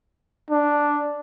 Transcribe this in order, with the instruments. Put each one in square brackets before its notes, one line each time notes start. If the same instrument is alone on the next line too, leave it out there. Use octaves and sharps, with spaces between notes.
[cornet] D4